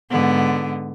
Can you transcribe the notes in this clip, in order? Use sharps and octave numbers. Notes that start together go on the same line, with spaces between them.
G#2 D3 B3